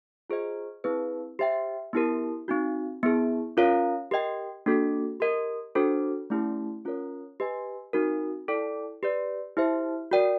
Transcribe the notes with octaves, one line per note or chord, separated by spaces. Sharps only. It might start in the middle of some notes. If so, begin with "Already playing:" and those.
F4 G#4 C5 D#5
C4 E4 G#4 B4
G4 C5 E5 G5
B3 E4 G4 A#4
C4 D#4 F#4
B3 E4 G#4
C#4 F4 A#4 C#5 F5
G4 A#4 D#5 G5
A#3 D4 F#4 A4
G4 A#4 D#5
D4 F#4 A4 C5
A3 C#4 E4 G4
C#4 F4 A#4 C#5
G4 B4 D#5 G#5
C4 D#4 F#4 A#4
E4 A4 D5 G5
G4 B4 D5
E4 G4 C5 E5
F#4 A#4 D5 G5